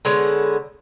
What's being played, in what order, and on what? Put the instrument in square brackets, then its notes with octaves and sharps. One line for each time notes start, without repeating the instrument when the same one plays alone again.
[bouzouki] D3 G#3 B3 C#5